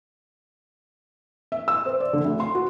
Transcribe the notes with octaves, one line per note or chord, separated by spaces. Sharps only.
E5
E6
C5
D5
D3
D2
C6
F#4